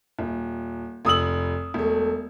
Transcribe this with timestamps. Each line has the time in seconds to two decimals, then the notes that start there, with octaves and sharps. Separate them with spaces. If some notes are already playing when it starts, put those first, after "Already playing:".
0.19 D#1
1.05 F1 D#6 E6 F#7
1.74 E1 A3